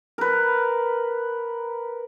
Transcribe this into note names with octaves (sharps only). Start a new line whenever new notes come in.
A#4 B4